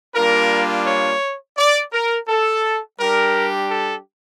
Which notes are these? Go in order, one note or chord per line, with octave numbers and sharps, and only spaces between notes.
G3 A#3 D4 F4 A#4
C#5
D5
A#4
A4
G3 D4 G4 A#4
A4